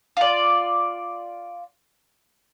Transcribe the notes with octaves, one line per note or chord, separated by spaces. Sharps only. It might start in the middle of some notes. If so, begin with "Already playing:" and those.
F4 D5